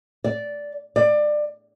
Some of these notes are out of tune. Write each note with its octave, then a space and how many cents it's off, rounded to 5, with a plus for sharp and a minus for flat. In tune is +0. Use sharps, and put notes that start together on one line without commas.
D5 -10
D5 +25